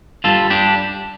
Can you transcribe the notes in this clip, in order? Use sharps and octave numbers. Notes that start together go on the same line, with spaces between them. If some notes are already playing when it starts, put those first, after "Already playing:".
G2 G3 F4 A4
D4 G4